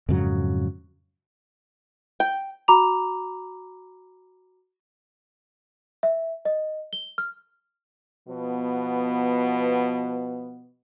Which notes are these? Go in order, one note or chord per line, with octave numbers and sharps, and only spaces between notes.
F2 G#2 C#3 F#3
G5
F#4 A#5 B5 D6 F7
E5
D#5
G7
F6
B2 F3 B3